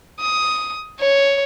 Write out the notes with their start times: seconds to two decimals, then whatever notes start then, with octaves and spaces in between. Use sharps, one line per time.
0.21 D#6
1.00 C#5